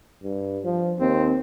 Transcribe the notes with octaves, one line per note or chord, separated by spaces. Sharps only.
G2
F3
D#2 C4